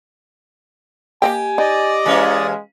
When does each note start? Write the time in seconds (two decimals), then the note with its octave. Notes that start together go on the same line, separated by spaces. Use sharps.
1.22 A#3 G4 D#5 G5 G#5
1.58 D#4 D5 D#5
2.06 E3 G#3 A#3 C#4